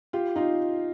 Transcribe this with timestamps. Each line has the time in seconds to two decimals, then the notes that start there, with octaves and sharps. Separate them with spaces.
0.13 F4 G4
0.36 D#4 F4